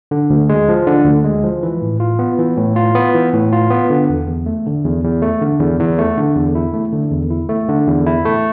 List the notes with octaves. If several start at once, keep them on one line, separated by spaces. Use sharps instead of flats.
D3
D2
G#3
F3
D3
D2
G#3
F3
E3
A2
F4
B3
E3
A2
F4
B3
E3
A2
F4
B3
D3
E2
E2
A3
D3
E2
E2
A3
D3
E2
E2
A3
D3
E2
E4
A3
D3
E2
E4
A3
D3
E2
E4
A3